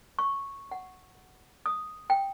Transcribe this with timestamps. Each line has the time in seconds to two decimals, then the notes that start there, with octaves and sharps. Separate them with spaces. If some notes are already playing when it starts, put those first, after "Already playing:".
0.19 C#6
0.71 F#5
1.66 D#6
2.10 G5